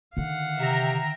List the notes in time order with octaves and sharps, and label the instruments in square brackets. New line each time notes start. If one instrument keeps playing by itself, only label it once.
[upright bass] D3 D#3 [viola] F5 F#5
[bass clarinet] C3 [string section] E5 G5 A#5